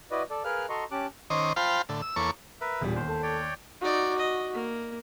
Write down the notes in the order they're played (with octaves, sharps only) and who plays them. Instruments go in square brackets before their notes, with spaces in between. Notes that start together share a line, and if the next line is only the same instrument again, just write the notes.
[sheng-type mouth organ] E4 F#4 B4 D5 D#5
A4 D5
G#4 A#4 B4 F5 F6 F#6
F#4 A4 D#5 A#5 C6 C#6
C#4 G4 A5 D6 F#6
[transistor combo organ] D#3 C#4 C5 D#5 D6
F4 C5 F5 G5 A5 B5
A2 D3
E6
E2 A#3 A4 C#5 C#6 D6
[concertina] A#4 B4 E5
[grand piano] E1 G3 [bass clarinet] A#2
[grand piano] D#2 [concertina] C5
[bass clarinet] A4
[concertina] C#5 D5 G5
[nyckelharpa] D#4 D5 [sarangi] F#4
[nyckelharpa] D#5
A#3